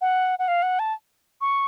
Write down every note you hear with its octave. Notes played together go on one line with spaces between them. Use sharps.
F#5
F#5
F5
F#5
A5
C#6